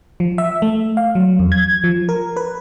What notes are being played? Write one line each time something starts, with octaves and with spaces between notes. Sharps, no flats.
F3
E5
A3
F5
F#3
F2
G#6
F3
A#4
B4